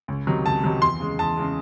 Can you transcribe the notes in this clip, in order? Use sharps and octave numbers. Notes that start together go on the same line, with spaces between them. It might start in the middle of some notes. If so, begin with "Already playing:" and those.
C#2
C3 D#3 F#3
C#2 A5
C3 D#3 F#3
E2 C6
C#3 G#3
E2 A5
C#3 G#3